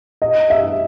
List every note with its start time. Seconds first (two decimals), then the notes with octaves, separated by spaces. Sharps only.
0.22 D#5
0.50 E5